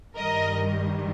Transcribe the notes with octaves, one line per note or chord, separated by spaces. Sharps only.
G2 D#3 G3 A#4 D#5